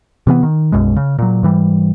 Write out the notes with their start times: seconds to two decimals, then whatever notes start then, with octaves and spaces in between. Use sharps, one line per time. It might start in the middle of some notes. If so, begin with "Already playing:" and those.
0.27 C3 E3 A3 B3
0.43 D#3
0.72 B1 F#2 B2 G#3
0.96 C#3
1.19 A#2 F#3
1.43 G#2 E3 G3